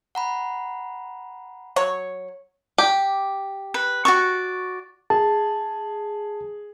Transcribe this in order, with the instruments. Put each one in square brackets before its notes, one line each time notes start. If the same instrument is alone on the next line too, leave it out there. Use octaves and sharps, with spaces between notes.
[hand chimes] F#5 A#5 B5
[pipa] F#3 C#5
[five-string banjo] G4
[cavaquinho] B4
F#4 D5 C#6
[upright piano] G#4 [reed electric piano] A5